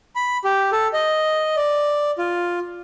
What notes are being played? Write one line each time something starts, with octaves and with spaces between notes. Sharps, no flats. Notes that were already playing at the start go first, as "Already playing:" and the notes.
B5
G4
A4
D#5
D5
F4